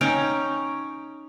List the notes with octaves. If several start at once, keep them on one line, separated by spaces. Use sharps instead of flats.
C#4 D#4 G5 A#5